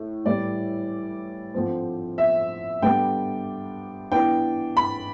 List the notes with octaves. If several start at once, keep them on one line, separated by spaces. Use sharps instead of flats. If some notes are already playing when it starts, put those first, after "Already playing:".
Already playing: A2
A2 E3 G3 D5
D3 F3 C4
E5
D3 G3 B3 D4 G5
E3 B3 D4 G5
B5